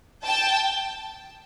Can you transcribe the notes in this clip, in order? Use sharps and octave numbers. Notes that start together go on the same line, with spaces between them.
G5 A5